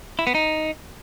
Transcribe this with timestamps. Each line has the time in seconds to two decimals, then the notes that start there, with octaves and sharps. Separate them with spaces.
0.19 E4
0.27 B3
0.35 D#4